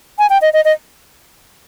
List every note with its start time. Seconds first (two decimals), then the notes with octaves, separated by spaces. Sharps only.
0.18 G#5
0.30 G5
0.42 D#5
0.53 D#5
0.65 D#5